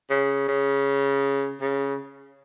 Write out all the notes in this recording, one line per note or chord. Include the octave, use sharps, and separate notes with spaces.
C#3
C#3
C#3